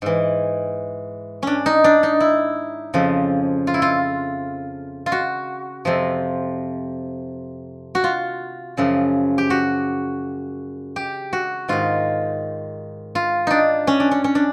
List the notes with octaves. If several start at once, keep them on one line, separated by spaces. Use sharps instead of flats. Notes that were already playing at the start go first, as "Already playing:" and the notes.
G#2 E3
C#4 D4
D#4
D4
D#4
E4
F2 C#3 F3
F4
E4
F4
F4
F#4
F2 C3 F3
F#4
F4
F#2 C#3 F3
G4
F#4
G4
F#4
G#2 D#3 F4
F4
D4 D#4
C#4
D4
C#4
C#4
D4